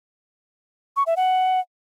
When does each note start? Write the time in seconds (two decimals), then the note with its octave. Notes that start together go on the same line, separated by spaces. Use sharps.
0.96 C#6
1.06 E5
1.17 F#5